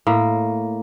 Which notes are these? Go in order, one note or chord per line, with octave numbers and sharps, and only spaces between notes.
A2 A#3